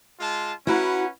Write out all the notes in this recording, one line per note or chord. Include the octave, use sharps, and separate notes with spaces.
G#3 F4 A5
C#4 E4 F#4 B4 F#5 A#5